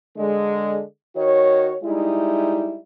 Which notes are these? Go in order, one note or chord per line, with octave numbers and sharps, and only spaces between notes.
D3 G#3
D#3 F#4 C#5
G3 G#3 D#4 E4